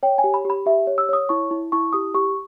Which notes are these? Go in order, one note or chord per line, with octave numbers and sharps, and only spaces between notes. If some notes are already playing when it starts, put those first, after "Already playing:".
C#5 G5
G#5
G4
B5
G4 B5
G4 E5
C#5
E6
C#5 D#6
E4 C#6
E4
E4 C#6
G4 D#6
G4 C#6